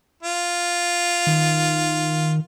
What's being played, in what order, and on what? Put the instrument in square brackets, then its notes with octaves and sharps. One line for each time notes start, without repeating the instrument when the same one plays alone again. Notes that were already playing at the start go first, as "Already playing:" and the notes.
[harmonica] F4
[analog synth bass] D#3